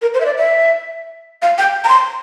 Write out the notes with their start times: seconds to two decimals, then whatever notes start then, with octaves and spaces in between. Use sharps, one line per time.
0.02 A#4
0.14 C5
0.21 E5
0.25 D5
0.37 E5
1.42 F5
1.58 G5
1.84 A#5
1.89 C6